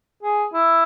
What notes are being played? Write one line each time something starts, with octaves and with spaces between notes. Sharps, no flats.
G#4
E4